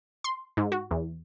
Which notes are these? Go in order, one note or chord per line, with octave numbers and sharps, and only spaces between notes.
C6
G#2
F#4
E2